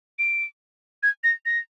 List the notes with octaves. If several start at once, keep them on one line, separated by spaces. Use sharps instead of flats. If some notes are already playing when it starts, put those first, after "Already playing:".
D7
G#6
A#6
A#6